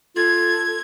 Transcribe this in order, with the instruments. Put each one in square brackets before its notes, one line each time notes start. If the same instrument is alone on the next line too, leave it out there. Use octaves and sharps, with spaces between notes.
[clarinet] F4 [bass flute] A4 [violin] G#6